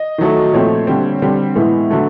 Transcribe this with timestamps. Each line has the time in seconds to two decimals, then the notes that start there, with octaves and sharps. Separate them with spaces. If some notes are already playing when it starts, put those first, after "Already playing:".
Already playing: D#5
0.18 D#3 F#3 A3
0.53 A#2 F3 A3 C4 C#5
0.87 D3 G3 C4
1.22 D3 G3 C4
1.56 A2 E3 G#3 B3
1.90 D3 F#3 A3